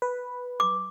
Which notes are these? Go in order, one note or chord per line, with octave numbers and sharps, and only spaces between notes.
B4
D6